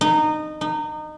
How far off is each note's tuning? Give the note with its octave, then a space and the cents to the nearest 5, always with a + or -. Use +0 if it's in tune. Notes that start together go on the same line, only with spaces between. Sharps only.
D#4 -20
D#4 -25